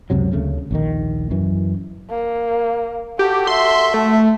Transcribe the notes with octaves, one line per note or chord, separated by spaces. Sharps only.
C#2 F#2 C3 F#3
D2 C#3 A3
A#1 D#2 D#3
F#2 E3
A#3
F#4 G4 A4
E5 C6
A3